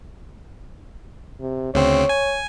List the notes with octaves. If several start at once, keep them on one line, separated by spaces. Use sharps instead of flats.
C3
D2 C#3 C4 C#5
G#5